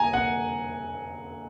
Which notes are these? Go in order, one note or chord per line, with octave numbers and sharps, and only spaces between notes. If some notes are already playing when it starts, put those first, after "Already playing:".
Already playing: G#5 A#5
F#5